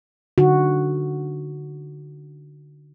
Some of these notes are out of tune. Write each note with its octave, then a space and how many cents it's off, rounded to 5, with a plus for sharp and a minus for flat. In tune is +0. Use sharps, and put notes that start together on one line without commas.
D3 +0 D#4 -5 F#4 +0